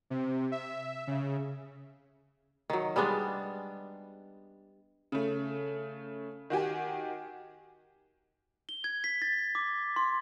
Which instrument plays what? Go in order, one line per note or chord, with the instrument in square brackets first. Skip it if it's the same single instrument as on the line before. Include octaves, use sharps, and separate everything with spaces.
[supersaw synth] C3
E5
C#3
[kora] D#3 F#3
G3 G#3 B3 D4
[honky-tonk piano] C#3 A3
D#3 F#4 G4 G#5
[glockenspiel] G7
G#6
B6
A6
D6
C6